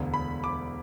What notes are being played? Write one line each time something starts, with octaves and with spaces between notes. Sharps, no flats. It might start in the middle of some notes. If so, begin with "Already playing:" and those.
Already playing: E1 D2 D3
B5
D6